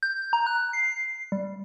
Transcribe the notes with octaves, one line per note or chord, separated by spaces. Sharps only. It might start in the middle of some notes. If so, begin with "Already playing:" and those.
G6
A#5
F#6
C7
G3